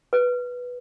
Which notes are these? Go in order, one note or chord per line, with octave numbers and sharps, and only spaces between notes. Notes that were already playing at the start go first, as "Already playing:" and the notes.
B4